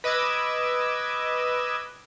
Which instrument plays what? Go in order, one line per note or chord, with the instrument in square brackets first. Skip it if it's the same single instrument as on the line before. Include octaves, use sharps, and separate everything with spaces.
[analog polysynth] B4 D#5 D6 E6 G#6